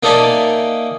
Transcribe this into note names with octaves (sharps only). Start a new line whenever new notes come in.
A#3 D#4 A4 D5 E5 G#5